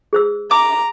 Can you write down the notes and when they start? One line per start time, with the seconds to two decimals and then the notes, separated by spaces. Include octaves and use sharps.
0.13 G#4 C5 E6
0.51 A#5 D6